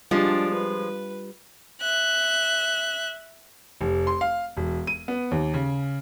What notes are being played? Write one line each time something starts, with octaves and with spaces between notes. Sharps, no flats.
F3 G3 G#3 D4 F4 G4
B4
E5 F#6
F1
C6
F5
E1
D#7
B3
D#2
C#3